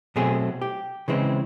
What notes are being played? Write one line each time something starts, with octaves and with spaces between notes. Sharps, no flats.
B2 F#3 A3 C4 G#4
G4
C#3 E3 G#3 C4